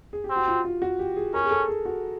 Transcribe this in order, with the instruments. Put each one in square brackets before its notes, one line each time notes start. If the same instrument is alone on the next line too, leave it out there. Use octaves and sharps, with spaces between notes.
[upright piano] G#4
G4
[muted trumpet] C4
[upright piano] F#4
F4
F4
F#4
G4
G#4
[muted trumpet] C#4 [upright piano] A#4
[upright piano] G#4
A4
G#4
F#4